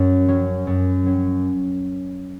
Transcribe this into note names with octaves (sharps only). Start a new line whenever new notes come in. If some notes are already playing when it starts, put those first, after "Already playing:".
Already playing: F#2 F#3 C#4
F#3 C#4
F#2
F#3 C#4